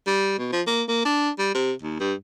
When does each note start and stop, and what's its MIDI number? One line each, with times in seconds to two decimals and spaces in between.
0.07 0.35 55
0.39 0.48 47
0.52 0.62 53
0.67 0.83 58
0.88 1.01 58
1.05 1.29 62
1.39 1.54 55
1.54 1.72 48
1.82 1.97 39
2.00 2.13 43